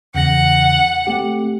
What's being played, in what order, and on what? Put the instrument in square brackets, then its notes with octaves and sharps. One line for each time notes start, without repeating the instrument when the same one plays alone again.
[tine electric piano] E2 C#3 A#6 [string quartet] F#5
[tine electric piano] A3 C4 G4